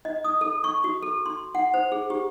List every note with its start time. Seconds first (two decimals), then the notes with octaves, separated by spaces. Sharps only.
0.05 D#5
0.24 D#6
0.41 A4
0.64 C#6
0.84 F#4
1.03 A4
1.26 C6
1.55 F#5
1.74 C5
1.92 G#4
2.10 G4